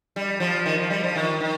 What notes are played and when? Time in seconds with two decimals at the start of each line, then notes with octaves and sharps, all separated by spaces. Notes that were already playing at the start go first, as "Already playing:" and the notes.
0.16 G3
0.40 F3
0.66 D#3
0.78 F3
0.90 G3
1.03 F3
1.16 D#3
1.41 D#3